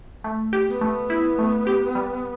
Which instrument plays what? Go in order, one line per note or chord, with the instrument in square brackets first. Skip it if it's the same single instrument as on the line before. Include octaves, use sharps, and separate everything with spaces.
[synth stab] A3
G4
[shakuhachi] B3
[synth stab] A3
E4
A3
G4
G3